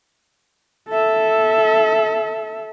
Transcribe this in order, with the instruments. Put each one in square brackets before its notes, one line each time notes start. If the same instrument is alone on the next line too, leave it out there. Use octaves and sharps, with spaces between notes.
[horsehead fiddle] A4 E5